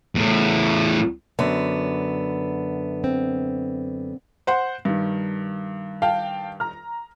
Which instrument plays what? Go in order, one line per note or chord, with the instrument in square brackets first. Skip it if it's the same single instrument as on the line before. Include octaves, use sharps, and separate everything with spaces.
[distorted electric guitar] E2 A2
[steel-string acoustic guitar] F#2 D3 B3
[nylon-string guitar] C4
[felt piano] C5 F#5 C6
G2 D#3
[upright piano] F5 G5 A5
A#5 F6